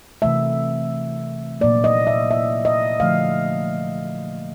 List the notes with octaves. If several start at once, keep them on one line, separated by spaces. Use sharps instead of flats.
C3 E3 A3 E5
A#2 F#3 A#3 D5
D#5
E5
E5
D#5
D3 F3 A3 F5